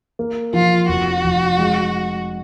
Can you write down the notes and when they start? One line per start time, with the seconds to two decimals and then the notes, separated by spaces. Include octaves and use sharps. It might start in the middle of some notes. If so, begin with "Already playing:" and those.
0.19 A#3
0.53 F3 F4
0.88 F1 F#4
1.24 F1
1.59 G#3